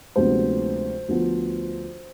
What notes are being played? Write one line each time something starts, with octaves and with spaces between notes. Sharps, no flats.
D2 C3 F3 G#3 B3 C5
D2 D3 F3 B3 F4